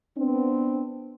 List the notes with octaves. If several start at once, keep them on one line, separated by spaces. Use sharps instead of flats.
B3 C4 D4